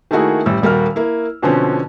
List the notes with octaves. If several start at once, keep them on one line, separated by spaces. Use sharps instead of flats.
D#3 A3 A#3 E4 F#4 G#4
A1 G3 E6
D#1 G3 A#3 F#4 F6
A#3 E4
B2 D3 F3 C4 C#4